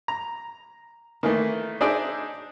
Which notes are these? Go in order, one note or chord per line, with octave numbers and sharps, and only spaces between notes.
A#5
D#3 E3 A3 A#3
D4 D#4 G#4 C5 D5 E5